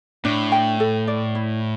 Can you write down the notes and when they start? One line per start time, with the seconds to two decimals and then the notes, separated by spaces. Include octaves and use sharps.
0.25 A2 D4
0.52 G5
0.80 A4
1.08 D5
1.35 E4